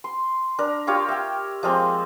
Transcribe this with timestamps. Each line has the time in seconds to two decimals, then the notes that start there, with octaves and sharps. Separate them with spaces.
0.04 C6
0.59 D4 A#4
0.87 F4 G4 C#5 F5
1.09 E5 G5
1.63 F3 G#3 A#3 C4